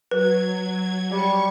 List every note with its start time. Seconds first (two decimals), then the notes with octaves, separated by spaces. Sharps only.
0.11 F#3 B4 G#6
1.11 G3 C#6